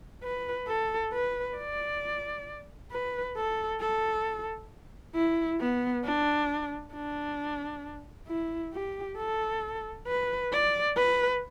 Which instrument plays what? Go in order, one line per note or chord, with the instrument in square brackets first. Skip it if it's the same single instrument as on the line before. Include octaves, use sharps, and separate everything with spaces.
[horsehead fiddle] B4
A4
B4
D5
B4
A4
A4
E4
B3
D4
D4
E4
G4
A4
B4
D5
B4